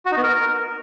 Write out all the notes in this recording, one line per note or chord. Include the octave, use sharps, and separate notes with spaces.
F#4
D#4
B3
A#4